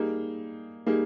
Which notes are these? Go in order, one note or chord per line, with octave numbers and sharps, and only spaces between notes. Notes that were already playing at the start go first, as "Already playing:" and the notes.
Already playing: G3 A#3 D#4 G#4
G3 A#3 D#4 G#4